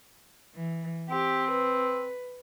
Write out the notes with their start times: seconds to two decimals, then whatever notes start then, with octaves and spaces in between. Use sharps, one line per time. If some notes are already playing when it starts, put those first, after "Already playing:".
0.55 E3
1.10 C4 G4
1.51 B4